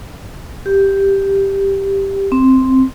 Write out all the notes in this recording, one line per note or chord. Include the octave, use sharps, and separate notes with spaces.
G4
C4